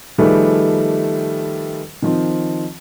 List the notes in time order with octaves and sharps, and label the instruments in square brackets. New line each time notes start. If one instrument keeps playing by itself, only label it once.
[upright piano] D#3 F3 G3 A3 G#4 B4
D#3 F3 C4